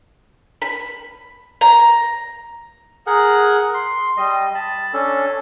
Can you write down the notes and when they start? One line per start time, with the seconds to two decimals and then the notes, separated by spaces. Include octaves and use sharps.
0.62 B5
1.61 A#5
3.07 G#4 A#4 F#5
3.74 C6
4.17 G3 D#5
4.55 A5 B5
4.93 C#4 D4 A4